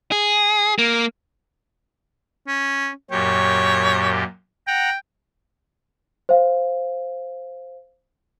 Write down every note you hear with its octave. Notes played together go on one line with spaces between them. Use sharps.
G#4
A#3
C#4
F#2 A#2 G4 C#5
F#5 G5 A#5
C5 F5